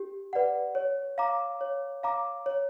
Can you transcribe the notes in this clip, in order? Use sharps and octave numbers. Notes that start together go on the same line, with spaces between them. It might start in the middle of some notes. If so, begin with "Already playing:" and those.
Already playing: G4
B4 D5 F#5
C#5
F5 A#5 D6
C#5
F5 A#5 D6
C#5